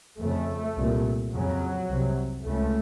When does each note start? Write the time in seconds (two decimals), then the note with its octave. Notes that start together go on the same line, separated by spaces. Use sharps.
0.19 F2 C#3 A3
0.77 C2 A#2
1.32 F2 C#3 F#3
1.89 C2 C3
2.45 C#2 C#3 A3